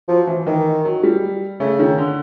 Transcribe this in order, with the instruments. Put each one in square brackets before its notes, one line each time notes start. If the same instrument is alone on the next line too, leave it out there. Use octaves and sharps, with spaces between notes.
[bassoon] F3 [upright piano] F#3
[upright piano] E3
[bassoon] D#3 [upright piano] E3
[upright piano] F#3
G3
[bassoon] C#3 [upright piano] A3
[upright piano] D#3
D3